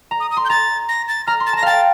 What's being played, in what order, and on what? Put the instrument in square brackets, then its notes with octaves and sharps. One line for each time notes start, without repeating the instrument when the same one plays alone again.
[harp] A#5
[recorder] D#6
D#6
[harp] C6
[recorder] G6
[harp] A#5 [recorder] A6
[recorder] A#6
A6
[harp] A#5 [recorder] F6
[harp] C6
[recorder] A6
[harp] A5 [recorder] A#6
[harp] F5 G5 [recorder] A6